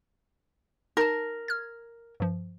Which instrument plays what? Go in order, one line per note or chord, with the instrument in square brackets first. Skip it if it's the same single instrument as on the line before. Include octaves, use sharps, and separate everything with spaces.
[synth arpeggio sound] D#4 A5 [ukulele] A#4
[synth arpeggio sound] F6 G#6
G2 F3